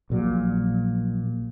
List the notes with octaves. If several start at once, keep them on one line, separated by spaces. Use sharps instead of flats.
A#1 A#2 F#3